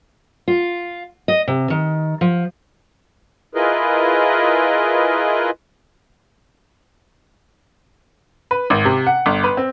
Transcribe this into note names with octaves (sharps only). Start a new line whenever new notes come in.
F4
D#5
C3
D#3
F3
E4 F4 G#4 A#4 B4 D#5
B4
G#1
C3
F#5
G1
B4
C4